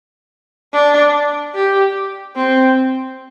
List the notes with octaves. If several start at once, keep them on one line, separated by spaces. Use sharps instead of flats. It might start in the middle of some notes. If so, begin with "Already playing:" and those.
D4
G4
C4